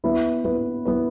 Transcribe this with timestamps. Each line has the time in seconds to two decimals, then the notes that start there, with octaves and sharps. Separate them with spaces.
0.04 B3 E4 B4
0.45 B3 E4 B4
0.85 B3 E4 B4